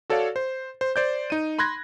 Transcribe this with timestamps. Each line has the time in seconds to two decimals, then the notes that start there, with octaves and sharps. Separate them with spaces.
0.10 F#4 A4 C#5 D5 F5
0.36 C5
0.81 C5
0.96 C5 D5 G6
1.30 D#4 D#7
1.59 B5 C6 F#6 G#6 A#6